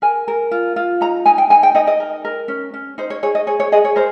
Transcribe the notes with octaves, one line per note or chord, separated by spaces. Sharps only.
A#4 G#5
A#4
F4
F4
D#4 A#5
D#4 G#5
G5
D#4 G#5
G5
D#4 D#5
D#5
A#4
A#4
C#4
C#4
D#4 C5
C#5
G#4 C#5
D#5
G#4 C#5
C#5
G#4 D#5
C#5
A#4 C5